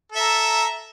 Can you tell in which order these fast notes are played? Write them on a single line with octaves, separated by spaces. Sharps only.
A4 E5 A#5